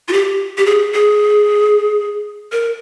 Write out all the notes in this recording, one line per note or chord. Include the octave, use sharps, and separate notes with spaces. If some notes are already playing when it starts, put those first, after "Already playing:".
F4
G4
G4
G#4
G#4
A#4